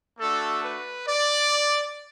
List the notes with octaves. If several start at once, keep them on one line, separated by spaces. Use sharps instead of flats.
A3 D4 F#4 A4
B4
D5